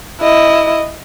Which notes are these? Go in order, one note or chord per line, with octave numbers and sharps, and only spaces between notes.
E4 D#5